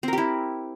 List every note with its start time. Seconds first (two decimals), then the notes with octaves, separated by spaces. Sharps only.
0.03 C4
0.08 A#4
0.13 G4
0.18 E4